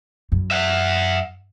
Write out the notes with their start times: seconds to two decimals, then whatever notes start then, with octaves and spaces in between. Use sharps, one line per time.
0.32 F#2
0.51 E5 F#5